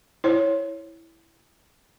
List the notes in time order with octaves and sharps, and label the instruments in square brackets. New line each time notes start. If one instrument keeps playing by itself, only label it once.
[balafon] E4 C5 C#5